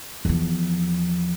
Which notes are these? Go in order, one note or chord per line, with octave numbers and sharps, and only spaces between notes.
E2 F3